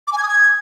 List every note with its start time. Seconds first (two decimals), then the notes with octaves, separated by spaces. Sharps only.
0.07 D6
0.13 G#5
0.18 G#6
0.23 D#6
0.28 G#6